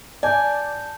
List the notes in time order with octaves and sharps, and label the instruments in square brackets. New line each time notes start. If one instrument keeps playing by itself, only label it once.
[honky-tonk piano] D5 [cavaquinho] G#5 [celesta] A5 G6